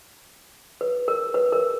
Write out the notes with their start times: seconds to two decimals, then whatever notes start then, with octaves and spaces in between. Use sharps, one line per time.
0.81 B4
1.08 A#4
1.34 B4
1.52 A#4